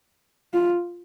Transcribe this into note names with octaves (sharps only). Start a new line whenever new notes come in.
F4